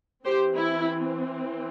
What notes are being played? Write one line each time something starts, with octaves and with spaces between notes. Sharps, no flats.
E3 C4 G4 C5
E4